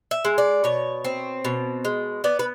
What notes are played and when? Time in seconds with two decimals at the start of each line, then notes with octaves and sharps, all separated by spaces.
0.11 E5
0.25 G#3
0.38 D5
0.64 B2 C#5
1.04 C4
1.45 B2
1.85 G#3
2.24 B3 D5
2.39 B4